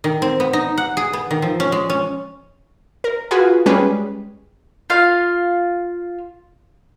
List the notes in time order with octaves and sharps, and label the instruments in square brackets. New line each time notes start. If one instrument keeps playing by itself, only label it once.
[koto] D#3
C4
B3
D#4
F#5
G#4
B3
D#3
F3
C#4
G#3
C#4
[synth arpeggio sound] A#4
F4 F#4 G#4 B4
G3 G#3 C#4 G#4 B4
[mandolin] F4 F5